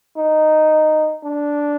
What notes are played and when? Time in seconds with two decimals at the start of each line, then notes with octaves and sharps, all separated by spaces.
0.17 D#4
1.24 D4